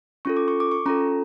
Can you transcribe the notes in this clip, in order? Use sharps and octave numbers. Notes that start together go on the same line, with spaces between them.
C#4 F4 A4 C#6
D6
C#6
D6
C#6
C#4 F4 A4 A#5